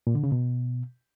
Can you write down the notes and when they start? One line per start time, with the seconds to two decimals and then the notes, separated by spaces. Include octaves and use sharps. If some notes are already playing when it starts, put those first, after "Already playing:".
0.07 A#2
0.15 D3
0.24 C#3
0.32 B2